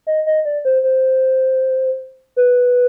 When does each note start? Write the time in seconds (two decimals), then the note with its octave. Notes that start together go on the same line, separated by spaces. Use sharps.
0.07 D#5
0.26 D#5
0.45 D5
0.65 C5
0.83 C5
2.36 B4